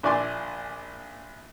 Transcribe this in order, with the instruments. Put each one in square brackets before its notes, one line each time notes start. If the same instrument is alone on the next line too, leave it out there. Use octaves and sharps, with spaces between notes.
[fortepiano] A#1 D4 E4 D5 G#5 C6